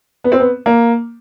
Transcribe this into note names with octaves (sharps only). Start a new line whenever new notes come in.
B3
C4
B3
A#3